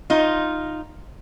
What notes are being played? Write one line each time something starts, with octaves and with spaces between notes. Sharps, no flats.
D#4 F4